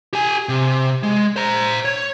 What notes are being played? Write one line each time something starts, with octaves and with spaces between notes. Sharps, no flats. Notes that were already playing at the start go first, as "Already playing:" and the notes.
G4 G#5
C3
G#3
C5 A#5
C#5